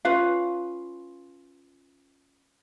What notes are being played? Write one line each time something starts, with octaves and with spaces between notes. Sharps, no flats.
C#4 F4 B4 F5